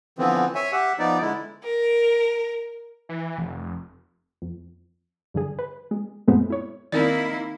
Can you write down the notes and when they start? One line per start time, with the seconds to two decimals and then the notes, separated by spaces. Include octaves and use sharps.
0.19 D3 E3 F3 B3 C4
0.55 C#5 E5 G#5
0.72 G4 E5 F#5
0.99 F3 B3 D#4 D5
1.21 D3 G#3 E4
1.63 A#4
3.09 E3
3.38 F1
4.42 F2
5.34 G2 D3 G#4
5.59 B4
5.91 G#3
6.28 F#2 A#2 G#3 A3 B3 C4
6.50 E4 C#5
6.92 D#3 A#3 C4 D#4 E4 A#4 D5